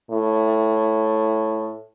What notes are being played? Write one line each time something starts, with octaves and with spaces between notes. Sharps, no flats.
A2